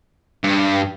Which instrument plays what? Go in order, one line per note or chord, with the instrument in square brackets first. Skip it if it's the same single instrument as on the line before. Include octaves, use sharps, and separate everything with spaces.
[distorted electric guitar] G2